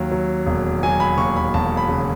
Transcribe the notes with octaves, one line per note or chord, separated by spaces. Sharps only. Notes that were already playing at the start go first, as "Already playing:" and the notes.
Already playing: D#2 F#3
F#3
E1
F#3 G#5
B5
D#2 C#6
B5
E1 A5
B5
C#3